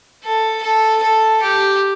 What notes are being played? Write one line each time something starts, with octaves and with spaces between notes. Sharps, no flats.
A4
A4
A4
G4